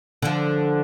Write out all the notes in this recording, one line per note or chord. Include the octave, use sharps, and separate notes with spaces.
D3 F3